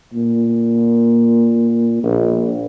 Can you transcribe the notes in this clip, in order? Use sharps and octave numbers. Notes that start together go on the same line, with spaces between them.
A#2
A#1